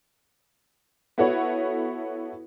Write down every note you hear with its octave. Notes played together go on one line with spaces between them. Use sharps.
B3 E4 F#4 A4 B4 C#5